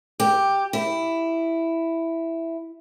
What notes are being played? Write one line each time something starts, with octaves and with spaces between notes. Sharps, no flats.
G4
E4